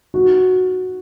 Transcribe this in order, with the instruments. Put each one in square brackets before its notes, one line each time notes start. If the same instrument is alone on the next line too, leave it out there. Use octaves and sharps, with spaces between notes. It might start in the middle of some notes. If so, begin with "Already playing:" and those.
[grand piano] F#4